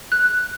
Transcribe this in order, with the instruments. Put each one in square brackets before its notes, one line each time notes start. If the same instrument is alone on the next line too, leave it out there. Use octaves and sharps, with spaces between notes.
[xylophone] F#6